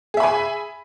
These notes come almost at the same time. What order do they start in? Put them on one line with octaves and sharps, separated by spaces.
G#4 E5 B5 G#5